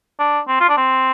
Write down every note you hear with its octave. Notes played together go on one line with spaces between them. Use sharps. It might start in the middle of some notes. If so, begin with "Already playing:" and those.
D4
C4
F4
D4
C4